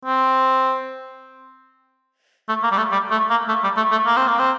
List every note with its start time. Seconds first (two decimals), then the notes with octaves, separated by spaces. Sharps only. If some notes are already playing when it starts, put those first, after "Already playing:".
0.05 C4
2.49 A3
2.63 A#3
2.72 G3
2.78 A3
2.92 G3
3.11 A3
3.30 A#3
3.48 A3
3.63 G3
3.77 A3
3.92 A3
4.06 A#3
4.17 C4
4.28 A#3
4.39 C4